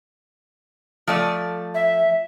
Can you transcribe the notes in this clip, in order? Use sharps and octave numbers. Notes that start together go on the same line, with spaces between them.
F3 A3 D5
E5